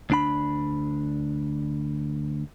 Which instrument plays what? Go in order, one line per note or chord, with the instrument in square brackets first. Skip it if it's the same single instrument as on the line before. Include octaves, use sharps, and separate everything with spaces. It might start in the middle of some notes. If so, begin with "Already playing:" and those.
[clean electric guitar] D2 D4 B5